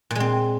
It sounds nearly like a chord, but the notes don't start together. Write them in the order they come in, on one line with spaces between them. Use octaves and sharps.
A#2 G#3 C4